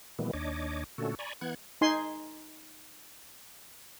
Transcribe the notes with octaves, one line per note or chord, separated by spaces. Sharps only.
A#2 D#3 E3 G3 A3 B3
D#2 D4 C#5 D#5 D6
A#2 D3 A3 C#4 F#4 A4
D5 G#5 A#5 B5 C#6
E3 B3 F#5 F#6 G#6
D#4 G#5 C6